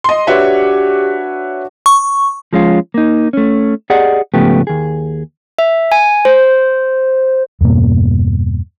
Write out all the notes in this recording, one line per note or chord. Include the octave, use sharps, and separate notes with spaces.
D#5 C6
D4 F#4 G4 B4 C#5 E5
C#6
F3 G#3 C#4 F4
A#3 D#4
A3 C#4
G4 G#4 D5 D#5 F#5
G#2 C#3 F3 A3 B3 G4
D#2 G#4
E5
G#5
C5
E2 G2 B2 A#3